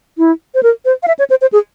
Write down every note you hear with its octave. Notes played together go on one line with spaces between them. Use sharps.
E4
C5
A#4
C5
F5
E5
C#5
C5
C5
G#4